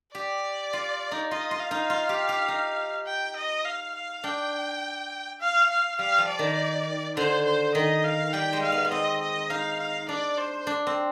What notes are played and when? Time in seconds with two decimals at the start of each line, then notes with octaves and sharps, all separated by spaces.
0.15 G4 D5
0.73 F4
1.12 D#4
1.31 F4 D#5
1.51 F4
1.60 F5
1.71 D#4
1.90 F4
2.09 G4
2.29 G4
2.48 D#4
3.07 G5
3.37 D#5
3.65 F5
3.95 F5
4.24 D4 G5
5.41 F5
5.70 F5
5.99 G3 F5
6.18 F3
6.29 D5
6.39 D#3
7.17 D3 C5
7.45 C5
7.75 D#3 D#5
8.04 F5
8.33 G3 G5
8.53 G#3
8.63 F5
8.72 B3
8.84 B3
8.91 C4 D#5
9.21 D#5
9.50 D#4 F5
9.80 F5
10.09 D4 D5
10.38 C5
10.67 D4
10.87 C4